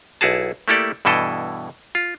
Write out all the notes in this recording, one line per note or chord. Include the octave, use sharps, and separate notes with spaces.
B1 E4 F#4 G#4 A5
A3 A#3 E4 G4 A4 D5
G2 B2 E3 E4 A4 D#5
F4